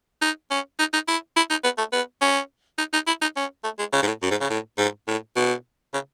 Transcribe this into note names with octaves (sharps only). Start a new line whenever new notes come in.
D#4
C#4
D#4
D#4
E4
E4
D#4
B3
A3
B3
C#4
D#4
D#4
E4
D#4
C#4
A3
G#3
C#3
G#2
A2
F#2
G#2
C#3
A2
G#2
A2
B2
C#3